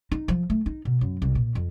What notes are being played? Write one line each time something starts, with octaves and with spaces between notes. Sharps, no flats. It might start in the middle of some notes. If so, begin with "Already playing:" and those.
D#4
F3
A3
D#4
B2
F#2
C2
A#2
F2